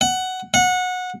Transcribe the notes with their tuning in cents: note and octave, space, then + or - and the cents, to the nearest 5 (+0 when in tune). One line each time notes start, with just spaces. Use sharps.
F#5 +10
F#5 -20